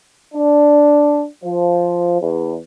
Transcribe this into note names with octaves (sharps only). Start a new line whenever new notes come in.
D4
F3
E2